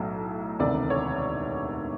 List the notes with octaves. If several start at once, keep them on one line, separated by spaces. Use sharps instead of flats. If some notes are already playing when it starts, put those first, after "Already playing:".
Already playing: B1 A2 F#3
E1 D2 C3 D#3 D5
C#5